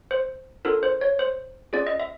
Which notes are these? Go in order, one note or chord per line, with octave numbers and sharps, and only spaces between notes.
C5
D4 F4 A4 A#4
C5
C#5
C5
C#4 F4 G#4 D5
D#5
E5